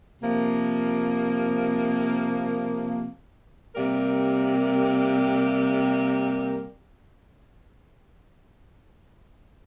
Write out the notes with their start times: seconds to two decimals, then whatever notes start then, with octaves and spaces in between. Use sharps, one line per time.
0.21 C3 F3 A#3
3.76 C3 G3 A#3 G4 A#4